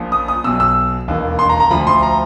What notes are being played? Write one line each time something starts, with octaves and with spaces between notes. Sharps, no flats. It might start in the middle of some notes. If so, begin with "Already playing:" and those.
Already playing: A#1 A#2 F3
D#6
D#6
B1 B2 E6
E6
E1 D#2 D#3
C6
A#5
A#5
D2 D3 F3 B5
C6
A#5